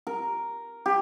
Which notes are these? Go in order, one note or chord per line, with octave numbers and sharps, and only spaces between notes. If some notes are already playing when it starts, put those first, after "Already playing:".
A#4
G4